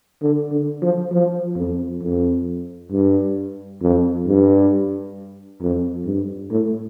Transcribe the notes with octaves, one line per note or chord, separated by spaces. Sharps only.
D3
D3
F3
F3
F2
F2
G2
F2
G2
F2
G2
A2